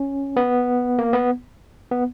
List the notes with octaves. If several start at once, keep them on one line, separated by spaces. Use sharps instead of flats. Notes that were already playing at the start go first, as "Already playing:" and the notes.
Already playing: C#4
B3
A#3
B3
B3